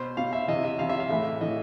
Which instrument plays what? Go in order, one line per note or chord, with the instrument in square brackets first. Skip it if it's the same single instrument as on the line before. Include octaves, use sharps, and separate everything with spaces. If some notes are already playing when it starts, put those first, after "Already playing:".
Already playing: [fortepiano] B2 C5
B2 F5
E5
C3 E3 D#5
E5
C3 E3 F5
E5
F5
A2 E3 E5
A2 E3 D#5